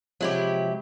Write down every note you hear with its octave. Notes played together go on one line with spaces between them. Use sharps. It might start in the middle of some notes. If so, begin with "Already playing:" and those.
C3 F3 F#3 G#3 E4 G4